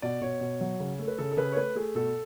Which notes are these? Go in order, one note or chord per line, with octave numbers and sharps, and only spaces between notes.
B2 D5
B2 C#5
B2
F#3
C#3
A3
B4
C#3 A4
A4
C#3 B4
C#5
A3 B4
A3 G#4
B2 A4